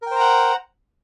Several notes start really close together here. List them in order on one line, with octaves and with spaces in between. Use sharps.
A#4 G5 C5 A#5 F#5